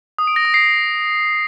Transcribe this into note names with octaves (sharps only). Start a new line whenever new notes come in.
D#6
D7
A#6
D#6
C7